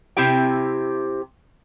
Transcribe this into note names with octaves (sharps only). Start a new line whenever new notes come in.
C3 C4 E4 G4 G5